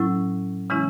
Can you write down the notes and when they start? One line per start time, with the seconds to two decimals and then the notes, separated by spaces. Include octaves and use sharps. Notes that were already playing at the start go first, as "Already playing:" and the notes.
Already playing: A2 F#3 C#4 E4
0.70 C#3 E3 G#3 C#4 E4